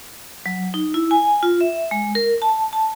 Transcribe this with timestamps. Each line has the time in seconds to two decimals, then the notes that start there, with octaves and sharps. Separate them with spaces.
0.46 F#3
0.74 D#4
0.94 E4
1.11 G#5
1.43 F4
1.61 E5
1.91 G#3
2.15 A#4
2.42 A5
2.73 A5